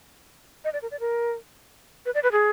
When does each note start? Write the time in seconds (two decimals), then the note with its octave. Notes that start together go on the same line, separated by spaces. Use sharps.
0.64 D#5
0.73 D5
0.82 A#4
0.91 D5
1.00 A#4
2.05 B4
2.14 D5
2.23 B4
2.32 G#4